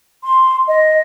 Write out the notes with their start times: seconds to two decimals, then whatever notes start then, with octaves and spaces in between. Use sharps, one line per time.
0.23 C6
0.67 D#5